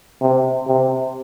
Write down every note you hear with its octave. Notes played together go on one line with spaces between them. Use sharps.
C3
C3